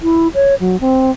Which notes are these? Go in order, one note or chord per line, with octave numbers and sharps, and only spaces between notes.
E4
C#5
F#3
C4